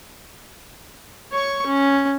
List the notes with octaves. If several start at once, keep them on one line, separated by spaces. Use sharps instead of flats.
C#5 C#6
C#4